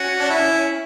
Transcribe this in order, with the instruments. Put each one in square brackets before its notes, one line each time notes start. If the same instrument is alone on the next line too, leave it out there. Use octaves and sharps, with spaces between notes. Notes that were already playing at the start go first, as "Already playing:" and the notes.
Already playing: [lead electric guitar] C#4 [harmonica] F#4
[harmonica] D4
E4